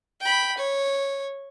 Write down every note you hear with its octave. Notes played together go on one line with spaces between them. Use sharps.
G5 B5
C#5